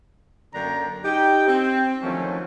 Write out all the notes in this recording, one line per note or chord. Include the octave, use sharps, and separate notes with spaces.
F#2 D3 A#3 D4 G5 A#5
D#4 G4 G5
C4
D3 D#3 F3 F#3 A3 C#4